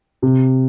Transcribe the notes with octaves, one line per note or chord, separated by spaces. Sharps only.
C3